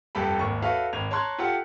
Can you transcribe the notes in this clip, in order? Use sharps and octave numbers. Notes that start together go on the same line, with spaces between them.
F1 G2 G4 A4 A5 B5
G#1 D#2 C#6
F#4 A4 B4 C#5 E5 F5
G#1 G#6 F7
C#5 A5 A#5 C6 F#6 G#6
F4 G4 A4 F#5